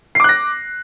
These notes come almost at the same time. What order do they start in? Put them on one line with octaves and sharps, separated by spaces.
C7 D6 F#6 A#6